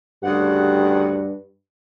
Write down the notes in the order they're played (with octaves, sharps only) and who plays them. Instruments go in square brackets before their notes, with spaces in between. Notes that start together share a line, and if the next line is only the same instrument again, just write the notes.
[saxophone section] D2 C#3 F#5 [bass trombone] G2 [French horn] G4